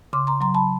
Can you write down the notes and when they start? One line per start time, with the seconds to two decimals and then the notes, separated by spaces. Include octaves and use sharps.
0.13 C#3 C6 D6
0.27 A#5 C6
0.41 F#3 A#5 C6
0.54 A5 B5